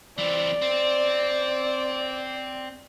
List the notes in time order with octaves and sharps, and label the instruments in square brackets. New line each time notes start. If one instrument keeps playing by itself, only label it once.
[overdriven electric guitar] E3 C4 [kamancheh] D5
[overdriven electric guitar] C4